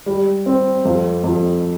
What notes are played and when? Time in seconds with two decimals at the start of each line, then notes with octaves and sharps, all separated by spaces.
0.06 G3
0.46 C4
0.85 F2
1.24 F2